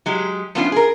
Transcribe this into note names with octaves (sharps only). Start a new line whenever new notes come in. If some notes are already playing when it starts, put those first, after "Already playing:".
F#3 G#3 G4
F3 A3 B3 C#4 D4 F4
G#4 A#4